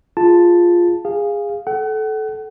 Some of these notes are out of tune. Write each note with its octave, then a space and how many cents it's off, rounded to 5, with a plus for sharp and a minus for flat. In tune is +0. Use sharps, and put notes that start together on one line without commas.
F4 +0 G#4 +0 A5 +0
G#4 -20 F5 +0
A4 -20 F#5 +35